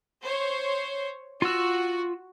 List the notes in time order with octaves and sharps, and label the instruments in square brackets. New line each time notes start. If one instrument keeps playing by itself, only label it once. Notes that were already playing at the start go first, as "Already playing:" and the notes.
[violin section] C5 C#5
[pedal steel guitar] F4 E6 [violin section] F#4